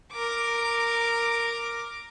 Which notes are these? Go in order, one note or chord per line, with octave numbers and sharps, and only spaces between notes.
A#4 D6